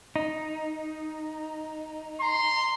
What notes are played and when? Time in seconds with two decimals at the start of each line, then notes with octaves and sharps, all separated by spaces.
0.16 D#4
2.21 A#5 C6